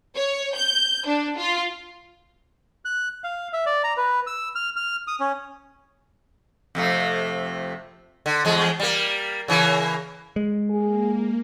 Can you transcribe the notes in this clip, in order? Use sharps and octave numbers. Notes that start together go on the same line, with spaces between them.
C#5
G6
D4
F4
F#6
F5
E5
D5
A#5
B4
E6
F6
F6
D#6
C#4
F2 C3 A3
D3
E2 G#3
G3 A#3
C#3 E3 A#3
G#3
A#3 G#4